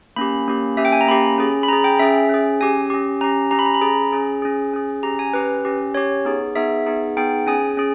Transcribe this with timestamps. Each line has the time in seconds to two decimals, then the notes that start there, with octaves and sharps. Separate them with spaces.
0.16 A#3 C#4 G4 B5
0.48 A#3 C#4 G4
0.77 A#3 C#4 G4 E5
0.85 G5
0.92 G#5
1.01 A#5
1.08 A#3 C#4 G4 B5
1.38 C#4 G#4
1.63 B5
1.68 C#4 G#4 A#5
1.84 G5
1.99 C#4 G#4 E5
2.29 C#4 G#4
2.61 C#4 G4 G#5
2.90 C#4 G4
3.21 C#4 G4 A#5
3.51 C#4 G4 A#5
3.59 B5
3.66 A#5
3.74 B5
3.82 C#4 G#4 A#5
4.12 C#4 G#4
4.42 C#4 G#4
4.73 C#4 G#4
5.03 C#4 G4 A#5
5.19 G#5
5.33 C#4 G4 B4
5.65 C#4 G4
5.94 C#4 G4 C#5
6.25 B3 D#4 G#4
6.55 B3 D#4 G#4 E5
6.86 B3 D#4 G#4
7.17 B3 D#4 G#4 G5
7.47 C#4 G#4 G#5
7.77 C#4 G#4